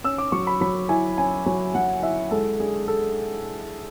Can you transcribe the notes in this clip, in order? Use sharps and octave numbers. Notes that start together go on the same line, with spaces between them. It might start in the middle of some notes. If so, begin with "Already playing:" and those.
C#4 E6
D6
F#3 C#6
B5
F#3 B5
E4 G#5
C#4 G#5
F#3 G#5
F#3 F#5
E4 E5
G#3 A4
D4 G#4
A4